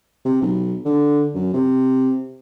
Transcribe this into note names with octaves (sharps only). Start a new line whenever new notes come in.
C3
B1
D3
F#2
C3